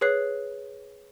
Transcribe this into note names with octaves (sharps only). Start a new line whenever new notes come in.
G#4 B4 C#5 F#6 C7